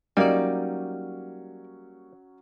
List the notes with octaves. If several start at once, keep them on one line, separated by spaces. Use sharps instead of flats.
F#3 G3 A#3 C#4 D#4 D5